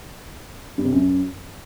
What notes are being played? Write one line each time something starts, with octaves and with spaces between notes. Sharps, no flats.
G2
C3
F#2